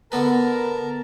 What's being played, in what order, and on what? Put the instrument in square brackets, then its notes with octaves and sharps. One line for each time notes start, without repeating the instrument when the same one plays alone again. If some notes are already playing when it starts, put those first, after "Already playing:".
[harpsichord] D3 B3 B4 [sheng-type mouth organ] A#4 A5 A#5